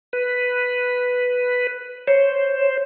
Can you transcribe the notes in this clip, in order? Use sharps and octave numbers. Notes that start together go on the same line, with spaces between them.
B4
C5 C#5